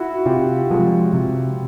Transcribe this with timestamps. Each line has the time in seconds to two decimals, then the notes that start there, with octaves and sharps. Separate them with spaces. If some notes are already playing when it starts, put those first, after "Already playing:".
Already playing: E4 F#4
0.26 C3 F4 G4
0.70 F3 G#3
1.14 C3